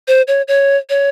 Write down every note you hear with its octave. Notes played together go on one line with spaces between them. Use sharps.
C5
C#5
C#5
C#5